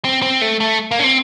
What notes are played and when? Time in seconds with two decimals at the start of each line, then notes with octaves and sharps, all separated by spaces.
0.05 C4
0.22 C4
0.41 A3
0.60 A3
0.91 A#3
0.99 C#4
1.04 C4